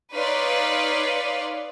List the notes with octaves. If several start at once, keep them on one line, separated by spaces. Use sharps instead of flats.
D#4 B4 C#5 D5 F5 C6